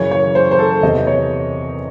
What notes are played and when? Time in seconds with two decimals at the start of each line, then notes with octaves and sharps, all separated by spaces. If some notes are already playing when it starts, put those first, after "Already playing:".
Already playing: F#2 C#3 E3 C#5
0.11 C#5
0.35 C5
0.51 C5
0.59 A4
0.83 E2 C3 E3 D#5
1.07 C#5